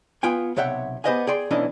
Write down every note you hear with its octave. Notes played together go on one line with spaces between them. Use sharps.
B3 F4 G5 G#5
B1 C3 C#5 E5 F#5 G5
B3 G4 C5 D#5 F5 G#5
G#4 D5 G5 C6
B1 E3 C#4 D4 D#5